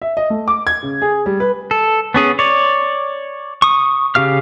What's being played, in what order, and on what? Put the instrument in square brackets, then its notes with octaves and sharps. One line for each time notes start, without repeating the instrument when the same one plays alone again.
[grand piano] E5
D#5
A3
D6
G#6
C#3
G#4
G3
B4
[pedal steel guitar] A4
B3 C#4 G#4
C#5 D5
C#6 D#6
C#3 G4 F5 F6